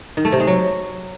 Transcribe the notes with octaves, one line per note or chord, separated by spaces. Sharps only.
D#3
A3
C3
G#3
F#3